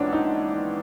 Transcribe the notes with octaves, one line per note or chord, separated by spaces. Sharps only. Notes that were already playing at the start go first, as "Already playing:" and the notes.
Already playing: A#1 G#2 E3 B3 C#4 D4
D#4